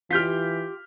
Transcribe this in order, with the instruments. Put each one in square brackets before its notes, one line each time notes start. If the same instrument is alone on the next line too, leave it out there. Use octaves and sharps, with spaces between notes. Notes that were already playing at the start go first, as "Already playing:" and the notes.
[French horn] E3 [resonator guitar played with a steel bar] F4 G4 [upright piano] F6 G6 B6